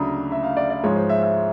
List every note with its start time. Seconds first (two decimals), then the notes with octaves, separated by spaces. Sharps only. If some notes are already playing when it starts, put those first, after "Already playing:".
Already playing: D2 C#3 F#3 A3 D4 A#5 B5 D#6
0.32 E5
0.43 F5
0.57 D5
0.70 D5
0.83 G#2 F3 G#3 C#5
0.96 C5
1.09 E5
1.23 E5